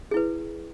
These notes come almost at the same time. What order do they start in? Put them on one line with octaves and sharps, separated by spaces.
G#4 E4 B4